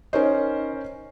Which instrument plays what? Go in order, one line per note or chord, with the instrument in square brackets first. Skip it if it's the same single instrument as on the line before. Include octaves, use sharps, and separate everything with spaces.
[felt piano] C#4 A#4 C5 [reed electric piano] D#4 C#5 D#5